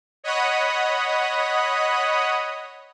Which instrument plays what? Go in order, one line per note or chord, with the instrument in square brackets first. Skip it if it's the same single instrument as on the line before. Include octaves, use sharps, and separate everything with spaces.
[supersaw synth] C#5 D#5 F#5 B5 D#6